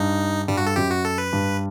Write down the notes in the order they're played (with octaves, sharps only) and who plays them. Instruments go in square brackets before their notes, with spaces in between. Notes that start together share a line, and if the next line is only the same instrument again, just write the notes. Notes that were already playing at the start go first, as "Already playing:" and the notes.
Already playing: [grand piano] G2 [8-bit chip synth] D#4
[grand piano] G2 [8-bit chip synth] G3
[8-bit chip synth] F#4
A4
[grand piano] F#2 [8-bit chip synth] G4
[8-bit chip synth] F#4
A4
B4
[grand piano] G2